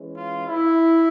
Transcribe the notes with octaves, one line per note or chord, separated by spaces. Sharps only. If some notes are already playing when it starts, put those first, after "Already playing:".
Already playing: E3 G#3 C#4
F4
E4